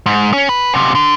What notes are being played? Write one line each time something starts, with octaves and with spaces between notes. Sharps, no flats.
G#2
C#4
B4
F#2 C3
D3